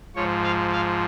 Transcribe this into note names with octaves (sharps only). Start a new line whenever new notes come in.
G#2 F3 C#5
F5
F5